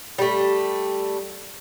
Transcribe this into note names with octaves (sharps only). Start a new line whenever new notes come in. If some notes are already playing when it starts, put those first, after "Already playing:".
G3 A3